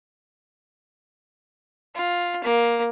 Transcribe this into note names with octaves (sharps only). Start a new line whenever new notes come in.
F4
A#3